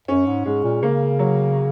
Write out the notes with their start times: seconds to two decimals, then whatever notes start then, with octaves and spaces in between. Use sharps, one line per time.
0.08 F#2 C#4
0.26 G#2
0.45 G#2 G#3
0.63 A#2
0.83 C#3 A#3
1.19 F#3